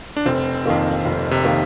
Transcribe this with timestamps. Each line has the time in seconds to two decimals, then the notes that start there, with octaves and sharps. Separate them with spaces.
0.17 D4
0.26 F1 C4
0.65 F2 D#3 A#3
1.05 F1
1.31 C3
1.45 D#3 A#3